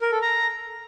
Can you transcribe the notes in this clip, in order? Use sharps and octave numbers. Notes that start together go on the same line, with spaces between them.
A#4
A4
A#5